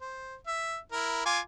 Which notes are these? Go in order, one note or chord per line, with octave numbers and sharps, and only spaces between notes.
C5
E5
E4 A#4
F4 G#5 D6